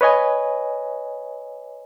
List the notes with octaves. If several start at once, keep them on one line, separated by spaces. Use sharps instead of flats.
B4 C#5 D#5 G#5